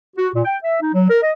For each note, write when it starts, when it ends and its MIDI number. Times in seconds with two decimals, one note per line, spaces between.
0.16 0.28 66
0.33 0.41 46
0.45 0.57 79
0.63 0.77 76
0.81 0.92 63
0.93 1.09 54
1.10 1.18 70
1.22 1.31 75